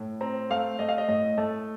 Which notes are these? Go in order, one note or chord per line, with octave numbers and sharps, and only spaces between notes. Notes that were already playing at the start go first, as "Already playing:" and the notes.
Already playing: A2
C4 A#5
A3 F5
A3 D#5
F5
D#5
A2 D#5
A3 A5